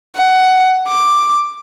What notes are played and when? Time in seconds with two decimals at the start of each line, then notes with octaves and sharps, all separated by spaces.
0.16 F#5
0.88 D6